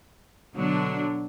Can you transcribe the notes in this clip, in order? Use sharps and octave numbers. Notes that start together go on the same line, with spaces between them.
B2 D3 F#3 D4